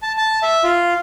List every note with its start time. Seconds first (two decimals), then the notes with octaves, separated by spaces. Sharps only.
0.02 A5
0.17 A5
0.42 E5
0.64 F4